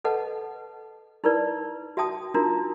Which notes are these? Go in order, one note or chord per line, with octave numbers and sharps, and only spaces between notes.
A4 B4 D#5 F#5 A5
D#4 E4 A#4 B4 D5
F#4 E5 G5 A5 D#6
D4 D#4 F4 F#4 A#4 A#5